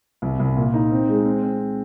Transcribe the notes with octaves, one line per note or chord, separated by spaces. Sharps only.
C2
C2
A#2
D#4
C4
G#3
C4
C4